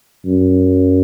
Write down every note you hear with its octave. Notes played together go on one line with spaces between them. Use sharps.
F#2